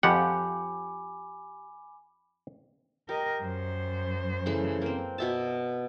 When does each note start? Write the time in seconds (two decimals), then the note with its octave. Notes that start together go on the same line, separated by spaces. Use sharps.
0.03 F2 F3 G4 F#5 G#5 B5 D6
3.09 G4 A#4 D#5
3.42 F#2 C5
4.46 C#3 E3 A3
4.82 A#3 C4
5.18 B2 E5 A5